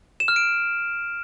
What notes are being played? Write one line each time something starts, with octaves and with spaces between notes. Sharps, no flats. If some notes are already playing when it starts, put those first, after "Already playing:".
E7
F6
D7